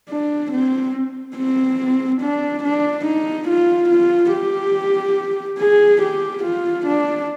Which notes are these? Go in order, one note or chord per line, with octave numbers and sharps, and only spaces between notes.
D4
C4
C4
D4
D4
D#4
F4
F4
G4
G#4
G4
F4
D4